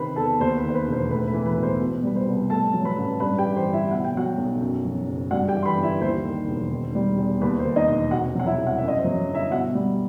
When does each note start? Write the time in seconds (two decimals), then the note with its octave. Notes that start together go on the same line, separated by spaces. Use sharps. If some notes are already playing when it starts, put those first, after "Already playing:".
Already playing: C3 D#3 B4 C5 B5
0.16 E2 A4 A5
0.40 D#2 C5
0.58 B4
0.64 D#3
0.69 C5
0.75 B4
0.87 E1
0.92 C5
1.10 A2 B4
1.28 B4
1.34 E3
1.46 B4
1.57 B1
1.63 C5
1.80 B2
2.03 G3 B4
2.16 C5
2.28 C2
2.50 A2 A4 A5
2.73 F#3
2.85 B4 B5
2.98 A1
3.20 G2 B4 B5
3.38 G4 G5
3.45 E3
3.56 C5
3.67 G1
3.73 E4 E5
3.90 B2 F#5
4.04 G5
4.14 F#3 F#4 F#5
4.37 B1
4.61 F#2
4.85 F#3
5.08 F#1
5.31 G2 F#4 F#5
5.48 G4 G5
5.54 E3
5.62 C6
5.66 B4 B5
5.78 G1
5.83 E4 E5
6.01 D#2 C5
6.24 D#3
6.47 E1
6.71 D#3
6.95 G3
7.18 E2
7.41 D#2 B4
7.59 C5
7.65 D#3
7.76 D#4 D#5
7.88 E1
8.11 C3 F#4 F#5
8.35 F#3 F#5
8.46 E4 E5
8.58 C2
8.67 F#5
8.78 F#2 E5
8.88 D#5
8.98 C5
9.04 F#3
9.28 G1
9.34 E4 E5
9.51 B2 F#4 F#5
9.75 G3